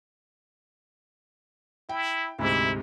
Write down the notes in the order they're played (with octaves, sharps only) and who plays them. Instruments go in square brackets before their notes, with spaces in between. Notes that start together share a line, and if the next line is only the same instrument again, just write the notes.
[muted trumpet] E4 [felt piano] G5
[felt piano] D2 G#2 C3 [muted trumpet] E4